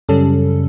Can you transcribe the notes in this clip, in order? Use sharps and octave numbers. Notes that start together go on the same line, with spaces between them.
F#2 C#3 G3 C#4 A4